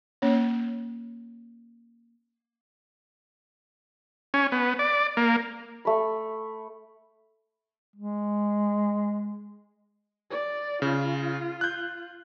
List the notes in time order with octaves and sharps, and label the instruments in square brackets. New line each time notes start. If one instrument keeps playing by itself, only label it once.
[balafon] A#3 C#4 C#5
[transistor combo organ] C#4
B3
D5
A#3
[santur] A3 B5
[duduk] G#3
[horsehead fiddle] D5
[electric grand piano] C#3 [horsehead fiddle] F4
[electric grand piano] F#6 G6